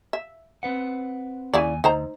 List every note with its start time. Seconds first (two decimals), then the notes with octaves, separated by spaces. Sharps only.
0.13 E5
0.63 C4 B4 F#5
1.54 D#2 C#3 E4 D5 G#5
1.84 D2 D#4 C5 A#5